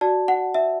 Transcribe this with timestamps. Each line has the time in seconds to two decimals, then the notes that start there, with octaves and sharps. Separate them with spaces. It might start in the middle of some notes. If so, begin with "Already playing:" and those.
0.01 F#4 D5 A5
0.28 F#5
0.54 E5